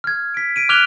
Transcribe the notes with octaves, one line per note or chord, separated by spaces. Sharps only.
F6 G#6
B6 D7
B6 D7 D#7
D6 F6 F#6 G#6 F7 G7